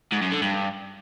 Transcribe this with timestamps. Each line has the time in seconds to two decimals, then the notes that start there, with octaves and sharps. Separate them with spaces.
0.12 G#2
0.22 F#2
0.32 D3
0.42 G2